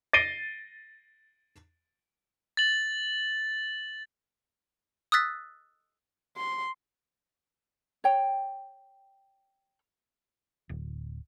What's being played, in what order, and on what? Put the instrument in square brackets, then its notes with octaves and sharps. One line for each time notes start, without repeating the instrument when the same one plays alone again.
[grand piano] A6 A#6 C7 D7 D#7 G7
[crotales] A6 F#7
[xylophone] D#6 E6 F#6 A6 B6
[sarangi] C6
[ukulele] C#5 G5
[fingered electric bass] D1